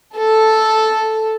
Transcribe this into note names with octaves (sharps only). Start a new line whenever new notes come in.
A4